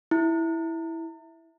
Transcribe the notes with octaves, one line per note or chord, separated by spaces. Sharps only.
E4